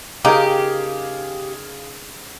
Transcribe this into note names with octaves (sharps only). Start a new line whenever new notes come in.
C#3 D#4 G4 G#4 A#4 F5